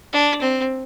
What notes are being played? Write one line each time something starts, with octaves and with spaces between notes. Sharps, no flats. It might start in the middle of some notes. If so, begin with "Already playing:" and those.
D4
C4